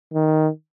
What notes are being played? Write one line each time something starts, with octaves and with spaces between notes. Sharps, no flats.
D#3